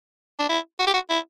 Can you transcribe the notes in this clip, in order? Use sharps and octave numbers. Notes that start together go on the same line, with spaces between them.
D4
E4
F#4
G4
F#4
E4